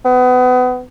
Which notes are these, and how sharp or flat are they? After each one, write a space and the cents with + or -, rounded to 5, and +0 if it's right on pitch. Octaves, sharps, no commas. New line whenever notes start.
B3 +30